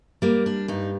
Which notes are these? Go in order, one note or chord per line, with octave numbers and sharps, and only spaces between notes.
G3 A#3
D4
G2 D#4